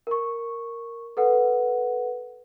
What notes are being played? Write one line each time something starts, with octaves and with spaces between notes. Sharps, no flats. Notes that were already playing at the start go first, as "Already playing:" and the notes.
A#4 C#6
A4 B4 F#5